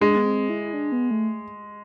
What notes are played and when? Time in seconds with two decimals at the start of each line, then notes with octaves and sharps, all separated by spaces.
0.01 G#3 D4
0.16 B3
0.26 C4
0.50 E4
0.74 D4
0.92 B3
1.11 A3